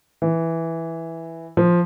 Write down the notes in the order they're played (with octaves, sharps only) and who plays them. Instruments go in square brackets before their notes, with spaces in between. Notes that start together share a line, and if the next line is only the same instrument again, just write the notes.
[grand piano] E3
F3